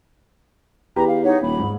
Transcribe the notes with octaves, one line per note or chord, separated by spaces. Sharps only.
E2 G4 B4 A#5
F5
D#4 C#5 F#5
D#1 B5
G#2